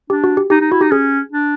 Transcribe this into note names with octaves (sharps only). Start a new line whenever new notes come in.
D4 G4
F#4
G4
D#4 G4
D#4
E4 F#4
D#4 G4
C#4 G#4
D4